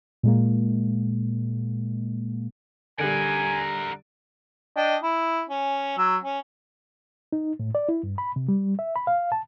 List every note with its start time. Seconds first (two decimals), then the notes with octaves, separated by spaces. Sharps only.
0.23 A#2 G#3 A#3
2.99 D3 G3 A#4 F#5 G#5
4.76 D4 D#5 G5
5.02 E4
5.49 C#4
5.98 F#3 E6
6.24 C#4
7.32 D#4
7.59 A2
7.75 D5
7.89 E4
8.03 G2
8.18 B5
8.36 C3
8.48 G3
8.79 E5
8.96 B5
9.07 F5
9.32 A5